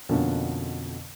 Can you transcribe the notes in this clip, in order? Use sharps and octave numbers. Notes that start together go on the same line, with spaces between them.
F2 B2 D3 A#3 C#4